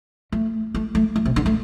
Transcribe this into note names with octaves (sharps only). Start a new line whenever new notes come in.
A3
A3
A3
A3
C3
D3
A3